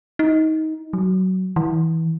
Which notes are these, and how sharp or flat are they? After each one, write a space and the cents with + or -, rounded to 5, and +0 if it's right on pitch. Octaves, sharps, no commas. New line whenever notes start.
D#4 +20
F#3 +15
E3 -25